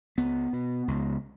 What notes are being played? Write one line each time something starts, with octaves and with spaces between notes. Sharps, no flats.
C#2 B3
B2
C#2